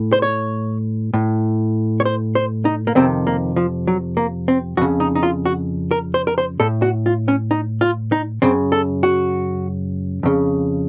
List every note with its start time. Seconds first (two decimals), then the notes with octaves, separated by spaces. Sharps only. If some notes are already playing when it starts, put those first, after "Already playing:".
Already playing: A2
0.13 C5
0.22 C#5
1.14 A2
2.00 C#5
2.05 C5
2.35 C5
2.65 D#4
2.87 A#3
2.95 F2 C3 D#3 C4
3.27 A#3
3.56 F3
3.87 F#3
4.17 A#3
4.48 C4
4.77 F2 C#3 F#4
5.00 D#4
5.15 D#4
5.23 F4
5.46 F#4
5.91 A#4
6.14 C5
6.27 A#4
6.38 C5
6.60 A2 A4
6.82 F#4
7.06 F4
7.28 C#4
7.51 D#4
7.81 F4
8.12 D#4
8.42 F#2 C#3 C4
8.72 A4
9.03 F#4
10.23 F2 C#3